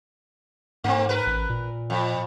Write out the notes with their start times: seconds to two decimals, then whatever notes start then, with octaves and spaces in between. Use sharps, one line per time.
0.84 G#2 A3 C4
1.09 A#4 B4
1.27 A1
1.49 A#2
1.90 F2